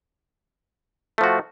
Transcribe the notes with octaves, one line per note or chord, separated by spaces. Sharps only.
F3 A3 F#4